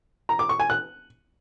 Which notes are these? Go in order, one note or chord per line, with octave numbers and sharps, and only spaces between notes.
A#5
D6
C#6
G#5
F#6